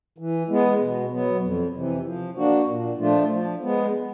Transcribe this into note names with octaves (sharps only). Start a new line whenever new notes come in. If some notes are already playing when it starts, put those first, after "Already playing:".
E3
G#3 B3
B2
F#3 B3
F2
C3 E3
F3
A#3 D4 F#4
A#2
F3 A3 D4 F4
F3
G#3 B3